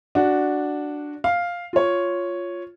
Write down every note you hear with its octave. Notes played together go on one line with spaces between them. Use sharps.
D4 F#4
F5
F4 C#5